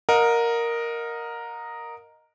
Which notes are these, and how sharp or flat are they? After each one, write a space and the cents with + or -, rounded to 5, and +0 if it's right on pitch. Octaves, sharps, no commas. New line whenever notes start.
A#4 +0 D#5 +0 F#5 -40